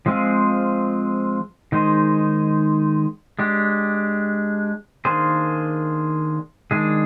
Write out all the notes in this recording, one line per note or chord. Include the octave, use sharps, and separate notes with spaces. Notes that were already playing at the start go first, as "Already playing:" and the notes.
F3 G#3 C4 F4 G#4
D#3 G#3 D#4 G#4 C5
G#3 D4 G4
D#3 A#3 D4 G#4 C5
D#3 G#3 D4 G#4